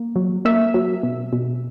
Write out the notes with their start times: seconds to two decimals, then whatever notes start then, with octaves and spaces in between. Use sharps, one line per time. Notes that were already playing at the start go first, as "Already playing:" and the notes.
Already playing: A#3
0.16 F#3
0.45 A#3 E5
0.74 F#3
1.03 B2
1.33 B2